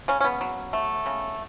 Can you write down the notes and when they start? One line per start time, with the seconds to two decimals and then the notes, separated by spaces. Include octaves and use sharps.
0.08 C#3 C#4
0.21 C#4
0.24 B3
0.41 F#3
0.73 A3
1.06 C#3